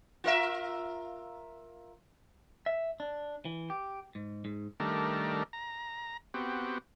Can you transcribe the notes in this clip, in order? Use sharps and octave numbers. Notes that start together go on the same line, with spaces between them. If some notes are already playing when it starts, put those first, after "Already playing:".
F4 A#4 E5
E5
D4
E3
G4
G#2
G#2
D#3 G3 A3 D4 A#4
A#5
B3 C4 F#4 G4